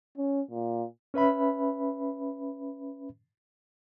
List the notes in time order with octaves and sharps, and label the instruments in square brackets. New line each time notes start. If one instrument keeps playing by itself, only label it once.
[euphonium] C#4
A#2
[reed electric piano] C#4 B4 E5 B5